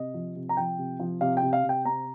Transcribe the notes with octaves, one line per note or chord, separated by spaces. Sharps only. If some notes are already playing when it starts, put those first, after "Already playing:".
Already playing: C3 D#5
F3
C3
A#5
F3 G5
C3
F3
C3 F5
G5
C3
F5
C3
G5
C4 A#5